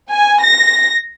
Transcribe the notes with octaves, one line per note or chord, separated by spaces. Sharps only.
G#5
A#6